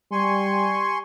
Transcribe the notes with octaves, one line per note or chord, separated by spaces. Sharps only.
G3 G#5 C6 C#6